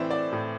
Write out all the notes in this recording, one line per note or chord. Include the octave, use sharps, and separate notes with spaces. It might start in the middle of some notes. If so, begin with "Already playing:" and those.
Already playing: A2 E3 C4 C5 D5 E5
D5
A2